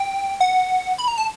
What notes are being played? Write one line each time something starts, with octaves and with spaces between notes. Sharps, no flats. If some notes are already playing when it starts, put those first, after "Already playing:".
Already playing: G5
F#5
B5
A#5
A5